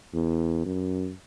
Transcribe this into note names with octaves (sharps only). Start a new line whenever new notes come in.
E2
F#2